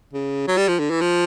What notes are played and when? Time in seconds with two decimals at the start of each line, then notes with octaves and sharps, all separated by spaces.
0.13 C#3
0.47 F#3
0.57 G3
0.68 F3
0.79 D3
0.90 E3
1.01 F3